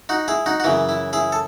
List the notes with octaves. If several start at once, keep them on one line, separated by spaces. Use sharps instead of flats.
D#4 F#4
E4 G#4
D#4 F#4
F#4
F#2 C#3 E3 E4
E4
E4 G#4
A4